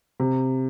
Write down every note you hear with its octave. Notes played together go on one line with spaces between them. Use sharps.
C3